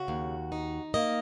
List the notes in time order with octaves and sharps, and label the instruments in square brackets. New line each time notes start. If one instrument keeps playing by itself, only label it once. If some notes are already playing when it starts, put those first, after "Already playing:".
Already playing: [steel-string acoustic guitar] C#3 F#4
D#2
D#4
A#3 D#5